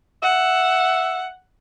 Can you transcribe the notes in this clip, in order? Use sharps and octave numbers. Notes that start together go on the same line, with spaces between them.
E5 F#5